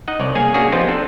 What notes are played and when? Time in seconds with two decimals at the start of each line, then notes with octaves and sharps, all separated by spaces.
0.08 D#4 D#5 F#5
0.20 C2 C#5 D5
0.35 A#3 G#4 C#5 F5 G#5
0.54 A#3 C#4 D4 F#4 G#4
0.72 F3 B3 C4 D#4 F4 G4
0.88 C4 D4 A4